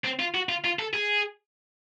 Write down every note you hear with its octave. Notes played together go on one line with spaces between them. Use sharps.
C4
F4
F#4
F4
F4
A4
G#4